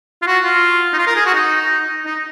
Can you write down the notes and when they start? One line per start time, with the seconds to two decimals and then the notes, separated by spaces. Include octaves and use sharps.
0.22 F4
0.27 F#4
0.44 F4
0.93 D#4
0.98 F4
1.07 A#4
1.16 G#4
1.26 F#4
1.34 D#4
2.06 D#4